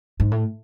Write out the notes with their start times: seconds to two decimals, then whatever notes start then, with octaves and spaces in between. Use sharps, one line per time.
0.20 G#2
0.31 A2